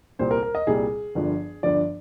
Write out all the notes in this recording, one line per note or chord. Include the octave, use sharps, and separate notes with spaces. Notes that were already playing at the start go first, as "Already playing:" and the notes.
C2 A#2 G3 C5
A#4
A#4
D#5
C2 A#2 G3 G#4
G1 G2 D3 F3
G1 G2 D3 F3 D5